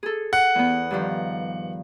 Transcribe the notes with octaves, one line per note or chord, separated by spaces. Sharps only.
G#4 A4
F#5
E2 B3
G2 D#3 F3